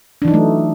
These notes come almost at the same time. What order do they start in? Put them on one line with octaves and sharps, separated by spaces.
D4 E3 D#4 F#3 A3